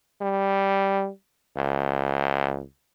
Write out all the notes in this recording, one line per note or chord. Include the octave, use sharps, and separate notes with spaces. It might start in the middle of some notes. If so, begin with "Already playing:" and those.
G3
C#2